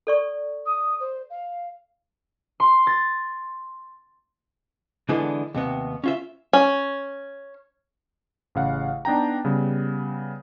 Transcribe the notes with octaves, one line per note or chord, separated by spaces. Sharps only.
A4 D5 C#6
D#6
C5
F5
C6
A6
D3 E3 G#3 B3 D4
D#2 C3 B3
C#4 F4 E5
C#4
A1 C#3 F5 F#5
B3 D4 D#4 G5 A#5
C#3 G3 B3